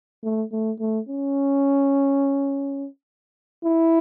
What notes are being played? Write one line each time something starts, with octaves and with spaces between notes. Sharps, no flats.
A3
A3
A3
C#4
E4